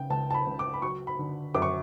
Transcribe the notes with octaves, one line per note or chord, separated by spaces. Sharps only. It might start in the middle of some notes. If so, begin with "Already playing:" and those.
Already playing: C#3 G5
C#2 A5
A5
B5
C#2
D6
B5
F#3 C#6
B5
D3
F#2 D6
C#6